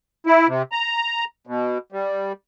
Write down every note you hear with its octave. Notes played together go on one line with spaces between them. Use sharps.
E4
C3
A#5
B2
G3